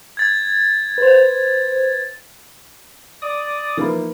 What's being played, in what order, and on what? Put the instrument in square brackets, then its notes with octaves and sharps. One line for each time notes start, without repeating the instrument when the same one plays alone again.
[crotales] G#6 A6
[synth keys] B4 C5
[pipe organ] D5 D#6
[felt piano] E3 F3 A#3 [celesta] D#4 B4 B5